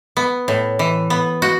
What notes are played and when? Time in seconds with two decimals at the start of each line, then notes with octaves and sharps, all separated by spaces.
0.17 B3
0.48 A2
0.79 E3
1.10 B3
1.42 F#4